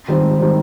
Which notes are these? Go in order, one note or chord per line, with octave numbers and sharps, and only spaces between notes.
D#3 G3 C4
G#2
D#3 G3 C4